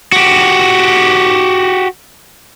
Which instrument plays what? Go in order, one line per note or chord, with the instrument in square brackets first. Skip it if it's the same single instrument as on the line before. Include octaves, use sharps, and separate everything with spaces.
[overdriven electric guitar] F#4 G4